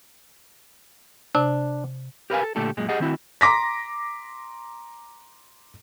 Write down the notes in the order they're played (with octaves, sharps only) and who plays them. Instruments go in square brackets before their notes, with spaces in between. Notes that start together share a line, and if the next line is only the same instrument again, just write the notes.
[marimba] C3 [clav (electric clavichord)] D4
[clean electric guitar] G4 A#4 B4 C#5 F5 G#5
A4
A#2 D3 A3 G4 A4
F#2 A#2 G#3
G4 G#4 D#5 F#5
D#3 C4 E4 F#4
[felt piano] A#5 C6 D6 A#6 B6